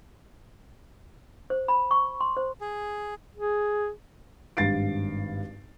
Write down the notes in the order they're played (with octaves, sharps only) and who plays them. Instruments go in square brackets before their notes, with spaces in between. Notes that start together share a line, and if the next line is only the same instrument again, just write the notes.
[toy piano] C5
B5
C#6
C6
C5
[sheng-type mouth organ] G#4
[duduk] G#4
[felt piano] G#1 G2 F5 A6 C7 D7